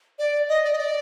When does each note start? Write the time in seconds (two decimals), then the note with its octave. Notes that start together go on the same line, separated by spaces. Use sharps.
0.19 D5
0.49 D#5
0.64 D5
0.73 D#5
0.78 D5